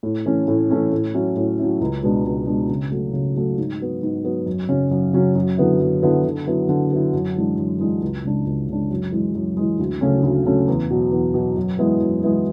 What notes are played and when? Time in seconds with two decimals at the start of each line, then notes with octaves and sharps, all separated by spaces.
0.03 A2
0.26 E3 A3 C#4
0.48 A2
0.70 E3 A3 C#4
0.93 A2
1.14 F#3 C#4 E4
1.37 A2
1.58 F#3 C#4 E4
1.81 C#2
2.03 B2 G#3 B3 D4
2.24 C#2
2.47 B2 G#3 B3 D4
2.70 C#3
2.92 F#3 A3
3.13 C#3
3.36 F#3 A3
3.58 G#2
3.81 F#3 B3
4.03 G#2
4.25 F#3 B3
4.46 F#2
4.69 C#3 F#3 C#4
4.91 F#2
5.13 C#3 F#3 C#4
5.35 F#2
5.57 D3 F#3 B3 E4
5.80 F#2
6.02 D3 F#3 B3 E4
6.24 D3
6.47 F#3 B3 E4
6.69 D3
6.91 F#3 B3 E4
7.13 F#2
7.36 E3 G#3 D4
7.58 F#2
7.80 E3 G#3 D4
8.01 C#2
8.24 C#3 G#3 D4
8.46 C#2
8.69 C#3 G#3 D4
8.90 F#2
9.12 E3 G#3
9.35 F#2
9.57 E3 G#3
9.79 D2
10.01 C#3 F#3 A3 C#4
10.23 D2
10.46 C#3 F#3 A3 C#4
10.68 E2
10.90 B2 F#3
11.12 E2
11.34 B2 F#3
11.56 F#2
11.79 E3 G#3 B3 E4
12.01 F#2
12.23 E3 G#3 B3 E4